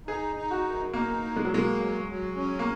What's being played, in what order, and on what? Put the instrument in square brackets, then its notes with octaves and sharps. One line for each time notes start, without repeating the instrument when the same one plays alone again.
[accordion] D#4 [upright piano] G#4
[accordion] D#4
[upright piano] F#4
[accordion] F#2
[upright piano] A#3 [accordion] D#4
[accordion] A#3
[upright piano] G#3
F#3
[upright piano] G#3 [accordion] A#3
[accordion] F#3
F#3
C#4
[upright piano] A#3